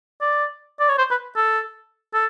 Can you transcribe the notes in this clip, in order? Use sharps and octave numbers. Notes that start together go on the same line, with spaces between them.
D5
D5
C#5
C5
B4
A4
A4